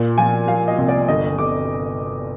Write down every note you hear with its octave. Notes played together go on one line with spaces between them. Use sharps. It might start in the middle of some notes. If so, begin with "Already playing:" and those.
Already playing: A#2
F3 G#5
F3 F5
D#5
C2
D5
G1 D#5
G1 D6